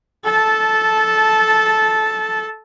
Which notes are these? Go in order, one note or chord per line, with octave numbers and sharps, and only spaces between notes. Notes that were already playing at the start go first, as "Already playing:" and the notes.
A4 A5